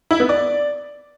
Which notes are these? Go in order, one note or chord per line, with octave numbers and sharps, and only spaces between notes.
E4
B3
D5